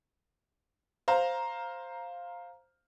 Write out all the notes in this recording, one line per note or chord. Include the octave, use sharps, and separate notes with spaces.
C5 F5 A#5